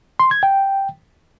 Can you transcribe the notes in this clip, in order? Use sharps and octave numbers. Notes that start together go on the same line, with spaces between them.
C6
G#6
G5